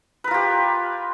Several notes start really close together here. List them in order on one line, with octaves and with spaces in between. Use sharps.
B4 A#4 F4 G4